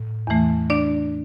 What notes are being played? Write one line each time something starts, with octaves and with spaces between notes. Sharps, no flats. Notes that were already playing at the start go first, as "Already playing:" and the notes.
Already playing: A2
E2 E3 A3
D4 D5